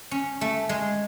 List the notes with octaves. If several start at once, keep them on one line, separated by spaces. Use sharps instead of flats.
C#4
A3
G#3